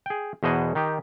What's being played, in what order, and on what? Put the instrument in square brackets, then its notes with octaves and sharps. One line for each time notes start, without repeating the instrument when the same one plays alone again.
[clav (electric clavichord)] G#4 G5
E2 B2 C5 D#5 F#5 G#5
D#3 D#4 G4